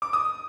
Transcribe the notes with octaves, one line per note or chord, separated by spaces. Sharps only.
D6
D#6